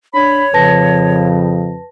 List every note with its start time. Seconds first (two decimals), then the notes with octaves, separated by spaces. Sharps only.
0.14 D4 C#5 B5
0.53 F2 C#3 F3 B4 A5 A#6